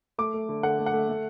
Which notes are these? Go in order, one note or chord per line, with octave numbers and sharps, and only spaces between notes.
A3 D6
A3
D3
D3 F#5
A3
F#5
A3
A3